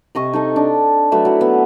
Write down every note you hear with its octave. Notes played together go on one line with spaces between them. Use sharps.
C3 D#5 C#6
D#4 A4 D#5
D4
F#3 A3 B4 E5
F#3 E4
B3